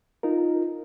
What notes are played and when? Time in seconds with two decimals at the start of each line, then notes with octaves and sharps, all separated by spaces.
0.23 D#4 F4 A#4